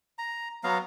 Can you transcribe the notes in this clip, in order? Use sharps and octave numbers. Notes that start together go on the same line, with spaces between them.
A#5
F#3 B3 F5 A#5